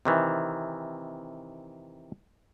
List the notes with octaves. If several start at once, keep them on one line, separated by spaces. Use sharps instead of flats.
C3 D#3 E3